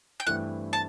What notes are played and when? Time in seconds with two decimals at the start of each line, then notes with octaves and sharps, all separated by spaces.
0.20 G5
0.27 G2 E3 A3 C4 E4 F#5
0.73 A5